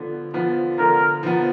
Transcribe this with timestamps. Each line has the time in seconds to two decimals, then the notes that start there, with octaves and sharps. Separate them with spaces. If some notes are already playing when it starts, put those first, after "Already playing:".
Already playing: D3 F3 B3
0.34 F3 B3
0.78 D3 A#4
1.23 F3 B3